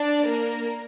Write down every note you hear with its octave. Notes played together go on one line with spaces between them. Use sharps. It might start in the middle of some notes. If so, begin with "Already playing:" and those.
Already playing: D4 D5
A#3 A#4